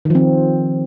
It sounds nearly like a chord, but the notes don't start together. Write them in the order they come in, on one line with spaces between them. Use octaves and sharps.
D#3 F3 C4